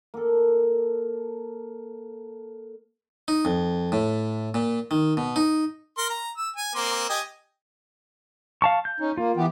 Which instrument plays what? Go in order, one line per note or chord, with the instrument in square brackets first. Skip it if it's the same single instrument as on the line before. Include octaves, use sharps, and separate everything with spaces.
[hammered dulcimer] A#3 A4
[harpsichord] D#4
F2
A2
A#2
D#3
B2
D#4
[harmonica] A#4 C6
A#5
E6
G#5
A#3 C4 C6
G4 D#5 G#5
[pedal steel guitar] F5 A5 C#6
G6
[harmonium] C#4 D#4
[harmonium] A#3 [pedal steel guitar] F4
[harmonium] E3 B3 G4